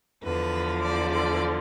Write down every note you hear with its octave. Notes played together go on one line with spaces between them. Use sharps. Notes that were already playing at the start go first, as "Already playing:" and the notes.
E2 D3 F3 B4
D5
D5